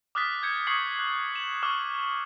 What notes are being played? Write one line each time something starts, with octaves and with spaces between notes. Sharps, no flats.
D6 D#6 F6 F#6 A6 B6
G6 G#6 C#7
C#6 D#6 G#6 C7 C#7 F#7
F#6
E7 F#7
C#6 D6 F6 E7